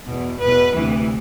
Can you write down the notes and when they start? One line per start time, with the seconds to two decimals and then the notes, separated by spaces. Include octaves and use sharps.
0.08 E2 B2
0.40 E2 B2 B4
0.74 D2 C3 E3